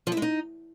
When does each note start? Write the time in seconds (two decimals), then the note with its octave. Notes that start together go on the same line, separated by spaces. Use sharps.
0.07 F3
0.12 E4
0.17 G#3
0.22 D#4